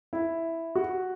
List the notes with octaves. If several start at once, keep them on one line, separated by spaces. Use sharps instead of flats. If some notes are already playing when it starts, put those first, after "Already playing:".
E4
F#4